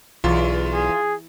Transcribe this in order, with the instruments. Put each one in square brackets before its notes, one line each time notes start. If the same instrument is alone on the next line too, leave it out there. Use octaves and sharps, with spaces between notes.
[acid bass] B1 [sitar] E2 [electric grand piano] F4
[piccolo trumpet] G#4